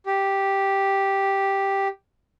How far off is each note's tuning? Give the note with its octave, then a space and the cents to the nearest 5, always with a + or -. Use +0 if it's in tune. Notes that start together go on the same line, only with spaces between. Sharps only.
G4 +0